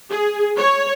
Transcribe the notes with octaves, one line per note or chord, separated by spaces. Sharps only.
G#4
C#5